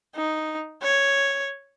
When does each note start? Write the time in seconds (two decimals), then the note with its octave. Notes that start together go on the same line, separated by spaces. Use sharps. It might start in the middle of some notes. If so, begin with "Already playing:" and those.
0.15 D#4
0.82 C#5